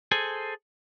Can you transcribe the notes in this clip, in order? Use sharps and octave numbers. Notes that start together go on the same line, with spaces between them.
G#4 A4 C5 G#5